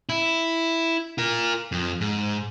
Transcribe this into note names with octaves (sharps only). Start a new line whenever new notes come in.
E4
F4 A#4
F2
G#2